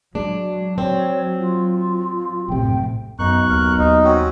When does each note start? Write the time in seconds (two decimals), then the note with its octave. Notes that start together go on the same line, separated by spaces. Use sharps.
0.15 F#3 G#3 D4
0.78 C4 C#5
1.38 F4
2.48 A#1 F#2 A2 C3 A3 G5
3.19 B1 F#2 D#4 C#6 F#6
3.49 D#2 A#4
3.78 D#2 D#4
4.04 C4 C#4 F#4